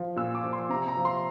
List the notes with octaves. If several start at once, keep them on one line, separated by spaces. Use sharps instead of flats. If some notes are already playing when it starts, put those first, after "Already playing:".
Already playing: F3
A#2 E6
D6
F3
C6
C3 A#5
A#5
F3
C6